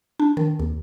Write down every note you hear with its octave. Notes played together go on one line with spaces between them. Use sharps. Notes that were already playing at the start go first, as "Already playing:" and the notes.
D4
D#3
D#2